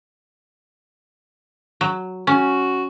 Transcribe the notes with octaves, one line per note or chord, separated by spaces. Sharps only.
F#3
C#4 F#4